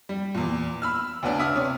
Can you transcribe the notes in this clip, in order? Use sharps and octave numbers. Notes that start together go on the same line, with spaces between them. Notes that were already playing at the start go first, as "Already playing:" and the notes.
G3
E2 A#2
B5 E6 F6
D2 C#3 B3 D4
E5 D#6 F6
C3 C#4